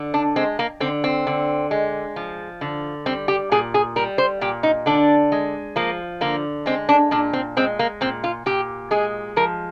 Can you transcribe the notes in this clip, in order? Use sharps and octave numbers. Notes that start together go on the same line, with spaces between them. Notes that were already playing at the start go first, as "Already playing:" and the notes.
Already playing: D3
D4
G#3 C4
A#3
D3 C4
C4
D3
G#3
F3
D3
G3 C4
G4
A#2 G#4
G#4
G3 A#4
C5
A#2 G4
D#4
D3 D4
G#3
F3 A#3
D3 A#3
G#3 C4
D4
A#2 D4
C4
G#3 C4
A#3
A#2 C4
F4
A#2 G4
G#3 G#4
F3 A#4